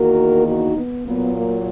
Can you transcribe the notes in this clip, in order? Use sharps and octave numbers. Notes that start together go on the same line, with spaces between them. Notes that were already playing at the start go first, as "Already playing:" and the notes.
Already playing: E2 D#3 A#3 F#4 A#4
D#4 F#4
B3
A#2 F#3 A#3 B3
A#3